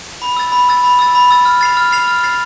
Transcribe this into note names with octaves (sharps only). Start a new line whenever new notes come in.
B5
E6 A6
B5
E6 A6
B5
E6 A6
B5
E6 A6
F6
A6 C7 F7
F6
A6 C7 F7
F6
A6 C7 F7